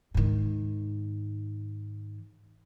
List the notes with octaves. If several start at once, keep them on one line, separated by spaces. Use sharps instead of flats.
G#2 D#3